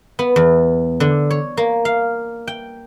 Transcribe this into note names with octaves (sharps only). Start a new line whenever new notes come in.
B3
E2
D3
C#5
A#3
F5
G5